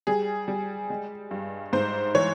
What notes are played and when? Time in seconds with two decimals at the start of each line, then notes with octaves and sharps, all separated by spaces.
0.07 G3 G#4
0.48 G3
0.90 G#3
1.31 G2
1.73 G#2 C5
2.14 E3 C#5